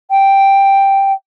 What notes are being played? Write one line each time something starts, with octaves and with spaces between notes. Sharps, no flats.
G5